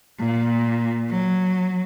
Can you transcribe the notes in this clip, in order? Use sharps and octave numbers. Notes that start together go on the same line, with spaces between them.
A#2
F#3